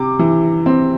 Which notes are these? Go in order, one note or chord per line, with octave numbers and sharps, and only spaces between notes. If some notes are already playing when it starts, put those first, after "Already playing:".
Already playing: C3 D6
E3
C4